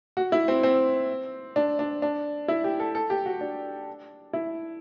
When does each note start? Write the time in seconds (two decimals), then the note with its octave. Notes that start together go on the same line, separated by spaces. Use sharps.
0.17 F#4
0.32 E4
0.48 C4
0.63 C4
1.56 D4
1.79 D4
2.02 D4
2.48 E4
2.64 G4
2.80 A4
2.95 A4
3.10 G4
3.26 F#4
3.41 D4
4.33 E4